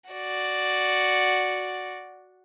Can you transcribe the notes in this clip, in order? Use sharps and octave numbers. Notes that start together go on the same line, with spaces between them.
F#4 D5